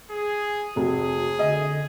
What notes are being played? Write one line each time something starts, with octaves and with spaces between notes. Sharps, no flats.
G#4
F1 F#4 G#4
D3 D#5